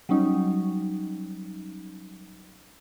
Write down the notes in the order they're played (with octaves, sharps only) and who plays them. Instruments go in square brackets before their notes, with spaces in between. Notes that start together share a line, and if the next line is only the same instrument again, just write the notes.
[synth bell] F#3 G3 C#4 D#4